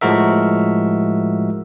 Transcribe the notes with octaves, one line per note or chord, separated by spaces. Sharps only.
A2 F3 G#3 F#4 A#4 E5